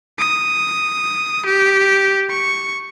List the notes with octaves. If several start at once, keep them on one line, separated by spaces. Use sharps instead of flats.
D#6
G4
C#6